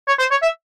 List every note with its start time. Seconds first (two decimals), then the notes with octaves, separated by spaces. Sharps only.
0.07 C#5
0.19 C5
0.31 C#5
0.42 E5